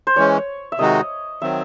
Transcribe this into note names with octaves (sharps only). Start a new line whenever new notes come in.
C5
E3 G#3 C#4 C#5
E5
C3 D#3 G#3 D#4 F#4 D#5
D#3 F#3 C4 E5